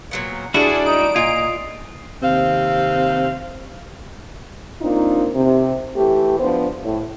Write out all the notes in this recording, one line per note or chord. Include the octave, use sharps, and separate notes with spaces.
A#2 F#3 B3
G3 A3 D4 E4 F#4 G#4 D5
D#4 D7
A#2 F4 D#5 G#5
D#2 C3 C4 F5
A#3 C4 D4 D#4 F4
C3
E3 A3 G4
F3 B3 D4 C5
A2